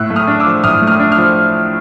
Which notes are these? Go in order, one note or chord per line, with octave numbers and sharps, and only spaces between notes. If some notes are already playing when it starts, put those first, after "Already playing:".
Already playing: A2 E6 F#6
A3
D#6 F6
D4
D6 E6
F3
A2 D#6 F6
A3
D#6 F6
D4
D#6 F6
F3